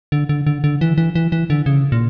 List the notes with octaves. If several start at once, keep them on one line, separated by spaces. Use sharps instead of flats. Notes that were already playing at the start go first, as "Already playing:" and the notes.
D3
D3
D3
D3
E3
E3
E3
E3
D3
C#3
A#2